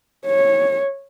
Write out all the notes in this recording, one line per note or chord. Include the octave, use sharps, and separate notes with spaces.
C#5